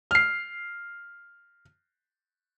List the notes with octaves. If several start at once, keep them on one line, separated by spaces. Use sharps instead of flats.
F6 C7